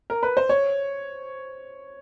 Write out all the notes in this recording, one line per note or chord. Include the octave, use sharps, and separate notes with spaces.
A#4
B4
C5
C#5